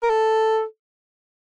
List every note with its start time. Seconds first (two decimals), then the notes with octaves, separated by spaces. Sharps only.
0.03 A#4
0.09 A4